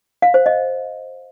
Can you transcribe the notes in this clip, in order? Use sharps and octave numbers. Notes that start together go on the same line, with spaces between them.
F5
C5
D#5